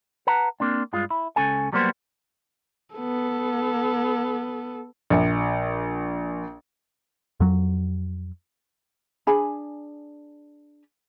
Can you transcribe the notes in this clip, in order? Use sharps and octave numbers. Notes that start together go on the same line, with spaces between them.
B4 F#5 A5 A#5
A#3 C4 D4
G2 G#3 F4
E4
C#2 C#4 A4 G#5
F#3 G3 A#3 B3 C5
B3 A4
A#1
F2 F#3
D4 G#4 G#5 B5